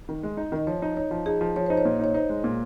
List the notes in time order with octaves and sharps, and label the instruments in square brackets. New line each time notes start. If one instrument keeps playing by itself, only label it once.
[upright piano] D#3
G#3
D#4
[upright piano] D#3 [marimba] D#5
[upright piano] F3 [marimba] C#5
[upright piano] D#4
[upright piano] D#4 [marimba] C#5
[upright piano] F3
[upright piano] D#4 [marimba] G#4
[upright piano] F3
[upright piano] F3 [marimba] C#5
[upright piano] D#4 [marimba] C5
[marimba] C#5
[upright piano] A#2
[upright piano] D#4 [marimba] C#5
[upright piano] D#4 [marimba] C5
[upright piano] G#3
A#2